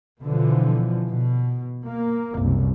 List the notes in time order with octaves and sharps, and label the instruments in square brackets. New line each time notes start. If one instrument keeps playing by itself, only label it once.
[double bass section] B2 D3 E3 F3
B2
A#3
F#1 C2